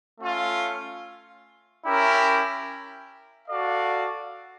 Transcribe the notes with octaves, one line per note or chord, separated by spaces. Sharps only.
A3 C#4 F4
C#4 E4 G4 A#4
F#4 A4 D5 F5